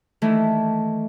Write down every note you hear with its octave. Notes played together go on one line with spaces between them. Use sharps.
D#3 E3 A3 E4